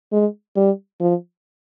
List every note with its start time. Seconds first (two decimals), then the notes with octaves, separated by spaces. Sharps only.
0.12 G#3
0.57 G3
1.01 F3